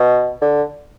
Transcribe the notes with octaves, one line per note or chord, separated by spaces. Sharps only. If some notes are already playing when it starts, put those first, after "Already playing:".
Already playing: B2
D3